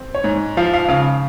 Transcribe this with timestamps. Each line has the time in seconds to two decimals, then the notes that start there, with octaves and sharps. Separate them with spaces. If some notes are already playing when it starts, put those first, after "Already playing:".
Already playing: C4
0.15 C#5
0.24 G#2
0.57 F3 F5
0.73 F5
0.89 C#3 F5